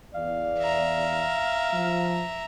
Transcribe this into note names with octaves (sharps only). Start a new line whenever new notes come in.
E2 D5 F5
E5 A#5
F3